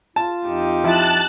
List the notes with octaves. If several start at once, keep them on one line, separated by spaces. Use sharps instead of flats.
F4 A5
F2 D#4 G4
F3 E4 A5 F#6